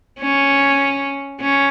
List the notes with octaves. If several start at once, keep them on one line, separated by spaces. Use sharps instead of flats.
C#4
C#4